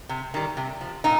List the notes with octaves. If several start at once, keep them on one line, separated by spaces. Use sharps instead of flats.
C3
D#3 G3
C3
F3
A#2 D#4